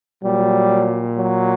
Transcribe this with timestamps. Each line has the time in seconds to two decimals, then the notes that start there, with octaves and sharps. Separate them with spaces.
0.23 A#2 F#3 G3
1.17 F#3